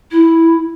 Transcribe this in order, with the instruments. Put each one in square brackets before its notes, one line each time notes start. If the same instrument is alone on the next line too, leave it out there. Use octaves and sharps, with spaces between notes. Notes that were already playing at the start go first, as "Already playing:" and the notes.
[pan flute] E4